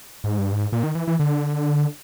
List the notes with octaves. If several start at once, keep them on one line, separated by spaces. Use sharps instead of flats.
G#2
G2
G#2
A#2
D#3
E3
E3
D3